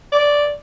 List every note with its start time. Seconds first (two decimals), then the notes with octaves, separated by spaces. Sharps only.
0.12 D5